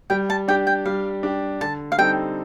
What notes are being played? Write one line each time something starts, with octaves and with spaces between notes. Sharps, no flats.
G3 G5
A5
D4 G4 G5
G5
G3 F5
D4 G4
D3 A5
F5
G3 C4 D#4 A4 G5